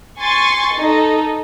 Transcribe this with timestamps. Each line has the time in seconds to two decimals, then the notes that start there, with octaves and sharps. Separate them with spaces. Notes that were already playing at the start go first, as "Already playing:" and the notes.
0.21 G#5 C6 C#6 A6
0.76 D#4 A4